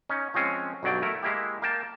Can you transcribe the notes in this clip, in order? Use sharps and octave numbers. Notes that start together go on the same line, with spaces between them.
C#4 D#4
F3 G#3 C4 C#4
B1 G2 F#3 D5 G5
A3 E4 A#4
G#3 A#3 E4 G4
A#3 G5 A5